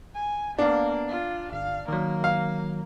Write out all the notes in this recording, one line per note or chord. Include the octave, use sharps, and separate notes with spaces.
G#5
A#3 B3 D4 F5
F4
G1 F5
D#3 F#3 A#3
F5